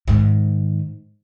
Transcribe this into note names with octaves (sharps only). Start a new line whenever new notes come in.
G#2 D#3